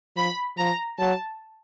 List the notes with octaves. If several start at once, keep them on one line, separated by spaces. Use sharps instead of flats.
F3 B5
F3 A#5
F#3 A5